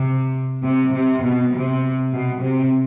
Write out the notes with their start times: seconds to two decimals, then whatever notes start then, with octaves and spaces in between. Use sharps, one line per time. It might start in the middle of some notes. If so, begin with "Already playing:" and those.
Already playing: C3
0.63 C3
0.93 C3
1.22 B2
1.52 C3
2.11 B2
2.41 C3